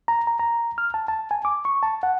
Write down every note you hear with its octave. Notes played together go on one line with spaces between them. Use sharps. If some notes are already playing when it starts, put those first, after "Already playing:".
A#5
A#5
A#5
F6
A5
A5
G#5
D6
C#6
A5
F#5